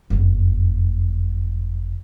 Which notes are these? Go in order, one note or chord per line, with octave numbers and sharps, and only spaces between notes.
F#1 F2